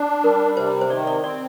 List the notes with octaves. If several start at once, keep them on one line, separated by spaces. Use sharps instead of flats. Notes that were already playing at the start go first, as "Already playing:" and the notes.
Already playing: D4
G3 A#4
C3 C5
C5
D#3 D5
D5
C4 D5